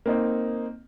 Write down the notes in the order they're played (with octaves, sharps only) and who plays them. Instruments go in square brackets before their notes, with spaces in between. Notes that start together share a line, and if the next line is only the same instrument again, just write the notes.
[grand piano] A#3 C4 D#4